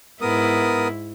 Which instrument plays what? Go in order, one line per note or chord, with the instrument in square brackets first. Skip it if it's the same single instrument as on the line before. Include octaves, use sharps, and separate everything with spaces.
[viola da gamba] G#2 E4 [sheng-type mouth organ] B3 A#4 D#6